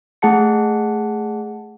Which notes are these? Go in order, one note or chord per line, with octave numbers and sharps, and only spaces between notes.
A3 G#4 F#5 A5 C#7